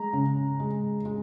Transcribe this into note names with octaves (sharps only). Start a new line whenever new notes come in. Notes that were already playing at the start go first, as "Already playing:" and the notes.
Already playing: G#3 A#5
C#3
G#3
G#3